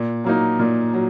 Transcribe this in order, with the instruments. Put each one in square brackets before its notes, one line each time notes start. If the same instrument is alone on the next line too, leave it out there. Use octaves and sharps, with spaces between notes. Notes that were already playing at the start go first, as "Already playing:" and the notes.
Already playing: [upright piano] A#2
F#3 A#3 D#4
A#2
F#3